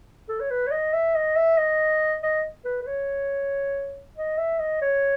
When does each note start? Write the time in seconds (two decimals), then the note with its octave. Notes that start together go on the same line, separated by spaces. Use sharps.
0.29 A4
0.40 C#5
0.50 B4
0.67 C#5
0.71 D#5
0.93 E5
1.15 D#5
1.36 E5
1.57 D#5
2.23 D#5
2.65 B4
2.83 B4
2.87 C#5
4.17 D#5
4.38 E5
4.59 D#5
4.81 C#5